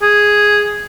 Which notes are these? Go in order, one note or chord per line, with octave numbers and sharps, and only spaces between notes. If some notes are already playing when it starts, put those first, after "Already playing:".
G#4